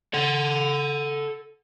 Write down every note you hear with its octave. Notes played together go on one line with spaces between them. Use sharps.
A4 F#5